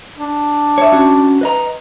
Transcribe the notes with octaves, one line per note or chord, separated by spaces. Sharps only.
D4
C#5 E5
C#4 F#4
B4 D#5 A#5